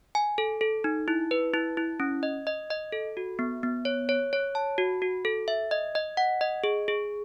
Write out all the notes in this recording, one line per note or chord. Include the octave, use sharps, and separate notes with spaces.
G#5
A4
A4
D#4
E4
B4
E4
E4
C#4
D#5
D#5
D#5
A4
F#4
B3
B3
C#5
C#5
C#5
A5
F#4
F#4
A4
E5
D#5
D#5
F#5
D#5
G#4
G#4